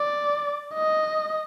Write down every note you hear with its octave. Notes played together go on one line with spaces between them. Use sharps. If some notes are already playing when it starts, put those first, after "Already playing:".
Already playing: D5
D#5